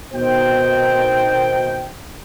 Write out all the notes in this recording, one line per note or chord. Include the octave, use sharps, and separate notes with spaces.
B2 D#3 C5 G5